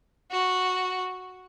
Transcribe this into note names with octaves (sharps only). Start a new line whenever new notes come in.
F#4